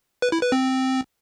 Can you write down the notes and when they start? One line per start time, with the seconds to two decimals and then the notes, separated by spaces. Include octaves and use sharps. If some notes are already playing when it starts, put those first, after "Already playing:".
0.22 B4
0.32 E4
0.42 B4
0.52 C4